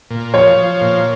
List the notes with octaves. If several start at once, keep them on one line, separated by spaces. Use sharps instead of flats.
A#2
F3 C#5
F3
A#2